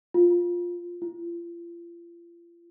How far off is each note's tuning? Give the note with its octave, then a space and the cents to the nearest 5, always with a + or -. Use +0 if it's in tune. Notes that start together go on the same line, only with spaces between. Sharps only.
F4 +10
F4 -40